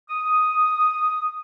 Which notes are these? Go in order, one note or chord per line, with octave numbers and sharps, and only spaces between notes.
D#6